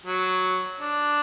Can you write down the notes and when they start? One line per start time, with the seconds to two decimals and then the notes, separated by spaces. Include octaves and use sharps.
0.06 F#3
0.81 D4